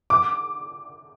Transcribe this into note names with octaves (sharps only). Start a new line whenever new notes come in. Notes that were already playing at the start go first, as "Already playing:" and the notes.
D6